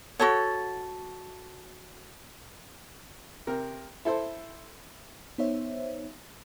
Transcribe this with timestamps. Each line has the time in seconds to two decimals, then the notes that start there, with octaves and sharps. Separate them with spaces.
0.19 F#4 A4 C#5
3.47 C3 A#4
4.05 E4 A4 C5
5.38 B3 D#4 C5 C#5 E5